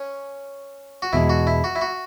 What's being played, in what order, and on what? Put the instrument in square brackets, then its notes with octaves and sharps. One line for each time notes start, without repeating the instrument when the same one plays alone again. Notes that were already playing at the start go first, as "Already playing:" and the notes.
Already playing: [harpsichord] C#4
F#4
[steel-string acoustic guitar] E2 B2 G#3 [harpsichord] E4
[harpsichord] F#4
E4
F#4
E4
F#4